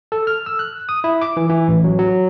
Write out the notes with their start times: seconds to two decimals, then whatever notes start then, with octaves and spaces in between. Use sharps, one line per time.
0.12 A4
0.27 F6
0.46 E6
0.59 F#6
0.89 D#6
1.04 E4
1.21 D6
1.37 E3
1.49 E3
1.68 A1
1.84 F#3
1.99 F#3